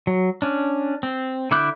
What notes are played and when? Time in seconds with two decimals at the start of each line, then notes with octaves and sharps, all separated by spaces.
0.07 F#3
0.42 C#4 D4
1.03 C4
1.51 D3 E4 D6 F#6 G6